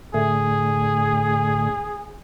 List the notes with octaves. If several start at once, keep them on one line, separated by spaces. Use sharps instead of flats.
A2 D3 A3 G#4